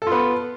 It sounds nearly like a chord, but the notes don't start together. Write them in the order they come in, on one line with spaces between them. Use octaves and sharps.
A4 F4 B3